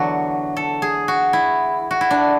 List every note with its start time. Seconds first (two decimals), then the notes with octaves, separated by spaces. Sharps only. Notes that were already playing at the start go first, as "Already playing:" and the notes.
Already playing: E2 D3 F#3 F#4
0.57 A4
0.82 G#4
1.08 F#4
1.33 E4
1.91 F#4
2.01 E4
2.11 D4